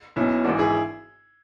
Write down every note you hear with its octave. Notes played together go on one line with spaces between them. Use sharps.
B1 B2 C#4 E4
G#1 G#2 E3 D4 F#4
E4 G#4